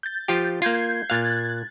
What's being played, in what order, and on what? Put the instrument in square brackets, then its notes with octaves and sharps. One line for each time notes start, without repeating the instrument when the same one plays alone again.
[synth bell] G6 A6
[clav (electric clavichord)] F3 F4 G4
[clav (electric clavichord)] A#3 F4 [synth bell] G6 G#6 C7
[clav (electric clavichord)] A#2 F5 [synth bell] F#6 G#6 A6